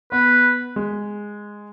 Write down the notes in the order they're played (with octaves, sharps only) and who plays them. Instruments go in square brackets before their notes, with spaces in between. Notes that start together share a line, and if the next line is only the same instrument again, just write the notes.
[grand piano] B3 [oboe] B4
[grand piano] G#3